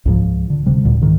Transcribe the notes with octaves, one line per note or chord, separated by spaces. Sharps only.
C#2 G#2 F3
D3
D1 C3 G3
D2 A#2 D3
C#2 G#2 D#3